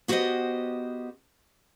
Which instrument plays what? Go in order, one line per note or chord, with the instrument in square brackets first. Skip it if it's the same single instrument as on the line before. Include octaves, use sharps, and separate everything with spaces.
[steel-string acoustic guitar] B3 F#4 G4 B4 C5 D#5